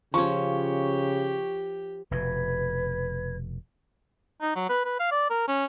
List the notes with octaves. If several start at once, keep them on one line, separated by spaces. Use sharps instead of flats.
C#3 F3 C#4 G4 C#6
F1 B2 B4 G#6
D#4
F#3
B4
B4
F5
D5
A#4
C#4